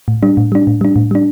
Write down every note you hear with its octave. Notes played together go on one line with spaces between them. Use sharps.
A2
G3 D4
A2
G3 D4
A2
G3 D4
A2
G3 D4